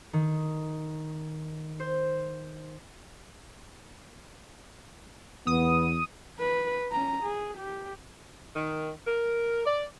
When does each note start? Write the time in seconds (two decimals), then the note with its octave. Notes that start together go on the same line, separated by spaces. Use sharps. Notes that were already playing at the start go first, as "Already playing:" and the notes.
0.13 D#3
1.80 C5
5.47 E2 B3 D#6
6.40 B4
6.92 C#4 A#5
7.23 G#4
7.58 G4
8.56 D#3
9.06 A#4
9.66 D5